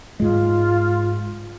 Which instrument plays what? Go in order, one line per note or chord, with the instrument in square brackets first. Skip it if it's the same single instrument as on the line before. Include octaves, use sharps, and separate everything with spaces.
[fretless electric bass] G#2 G#3 [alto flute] F4